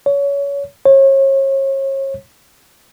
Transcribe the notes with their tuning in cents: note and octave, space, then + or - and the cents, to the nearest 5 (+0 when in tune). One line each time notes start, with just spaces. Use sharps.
C#5 +25
C#5 -35